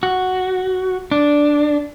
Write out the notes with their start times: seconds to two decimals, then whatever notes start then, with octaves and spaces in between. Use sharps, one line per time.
0.03 F#4
1.11 D4